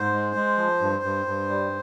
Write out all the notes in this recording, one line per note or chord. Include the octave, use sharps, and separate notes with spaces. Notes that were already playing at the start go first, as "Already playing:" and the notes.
Already playing: G#2 C5
G#3
G#3
F3
G2
G2
G2
G3